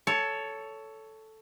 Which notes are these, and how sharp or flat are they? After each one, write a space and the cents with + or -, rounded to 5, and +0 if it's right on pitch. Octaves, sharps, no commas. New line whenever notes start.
A4 +0 C#5 +15